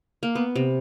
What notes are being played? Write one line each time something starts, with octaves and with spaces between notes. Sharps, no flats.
A#3
B3
C3